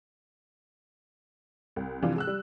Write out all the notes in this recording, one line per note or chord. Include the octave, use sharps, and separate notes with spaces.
C2
C3 E3 F3 D4 F4
G#3 E6 F#6
G3